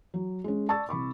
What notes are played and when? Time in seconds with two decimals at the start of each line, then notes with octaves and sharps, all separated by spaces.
0.14 F#3
0.44 G#3 C#4
0.68 D5 A5 C#6 E6 A6
0.89 C2 B5 C#6 D6